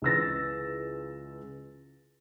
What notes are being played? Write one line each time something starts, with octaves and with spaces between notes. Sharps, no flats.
C#2 C#3 E3 E6 A6 A#6